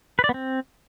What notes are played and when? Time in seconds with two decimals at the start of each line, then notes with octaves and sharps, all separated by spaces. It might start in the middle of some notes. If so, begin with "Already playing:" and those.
0.19 B4
0.24 D5
0.29 B3
0.34 C4